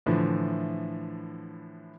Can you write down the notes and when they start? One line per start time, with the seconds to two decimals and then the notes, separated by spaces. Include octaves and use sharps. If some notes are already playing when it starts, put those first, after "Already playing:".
0.06 A2 D3 E3 F3